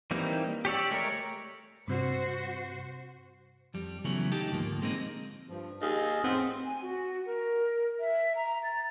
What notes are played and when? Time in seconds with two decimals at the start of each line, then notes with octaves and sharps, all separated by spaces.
0.11 E3 G3 A#3 C4 D#4
0.65 G4 C#5 D5 E6
0.91 G#3 A3 A#4 C#5
1.88 G2 C3 F#4 C5
3.74 F2 G3
4.05 C#3 E3 F#3 A3 B3 C#4
4.32 G3 D#4 G4 A4
4.51 D2 G#2 F3 A#3
4.82 G#3 A#3 C4 C#4 D#4
5.49 G2 F3
5.81 D#2 G#4 D#5
6.24 F2 A2 B3 C4
6.65 G#5
6.82 F#4
7.26 A#4
8.00 E5
8.36 A#5
8.63 A6